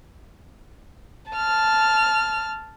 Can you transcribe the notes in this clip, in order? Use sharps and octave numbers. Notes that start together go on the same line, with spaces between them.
A5 F6